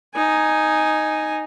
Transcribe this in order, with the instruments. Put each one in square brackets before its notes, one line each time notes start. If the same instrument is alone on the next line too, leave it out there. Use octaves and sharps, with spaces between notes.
[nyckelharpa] D#4 G#5